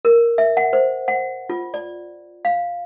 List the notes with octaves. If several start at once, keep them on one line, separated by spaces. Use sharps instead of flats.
A#4
E5
F#5
C5
F#5
F4
D5
F5